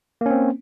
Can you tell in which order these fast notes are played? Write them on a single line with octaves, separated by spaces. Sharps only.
A#3 C#4 C4